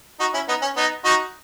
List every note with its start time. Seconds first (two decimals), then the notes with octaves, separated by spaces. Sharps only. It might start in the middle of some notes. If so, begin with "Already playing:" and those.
0.20 D#4 F#4
0.34 C#4 E4
0.48 B3 D#4
0.62 C#4
0.77 B3 D#4
1.05 D#4 F#4